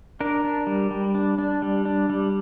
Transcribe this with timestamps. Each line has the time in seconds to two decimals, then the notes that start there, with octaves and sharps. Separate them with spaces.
0.20 D4 A#4
0.44 D4
0.67 G3
0.91 G3
1.15 D4
1.38 D4
1.62 G3
1.85 D4
2.10 G3